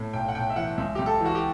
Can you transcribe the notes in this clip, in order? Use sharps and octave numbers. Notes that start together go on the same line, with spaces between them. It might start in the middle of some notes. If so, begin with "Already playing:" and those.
Already playing: A2
B1 G5
F#5
B1 G5
E5
E3 F#5
C#2 E5
C#2 G4
A4
E3 F#4
G4